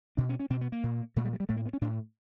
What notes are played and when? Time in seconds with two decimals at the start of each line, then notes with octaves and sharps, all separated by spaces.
0.17 B2 D4
0.29 C#4
0.40 C#4
0.50 B2 C4
0.61 B3
0.72 A#3
0.83 A#2
1.16 A#2 A3
1.25 G3
1.33 F#3
1.40 G3
1.49 A2 A3
1.56 A#3
1.66 B3
1.73 C#4
1.81 A2 D4